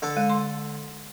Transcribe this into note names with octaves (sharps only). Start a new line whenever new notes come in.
D3 A4
G#3
C6